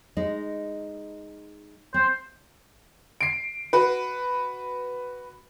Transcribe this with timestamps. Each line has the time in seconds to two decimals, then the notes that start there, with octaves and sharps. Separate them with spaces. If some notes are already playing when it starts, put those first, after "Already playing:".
0.17 G#3 D#4
1.94 C4 C5
3.21 C7 D7
3.73 F#4 B4